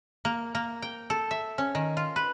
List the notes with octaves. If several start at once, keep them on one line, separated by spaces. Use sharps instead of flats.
A#3
A#3
G5
A4
E5
C#4
D#3
F4
B4